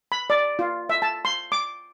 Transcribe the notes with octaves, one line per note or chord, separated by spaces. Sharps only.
B5
D5
F4
E5
A5
C6
D6